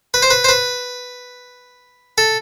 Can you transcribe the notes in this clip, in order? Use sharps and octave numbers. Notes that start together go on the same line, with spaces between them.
B4
C5
B4
C5
B4
A4